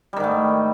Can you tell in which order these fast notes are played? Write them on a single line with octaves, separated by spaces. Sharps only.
G3 D#3 G#2 A3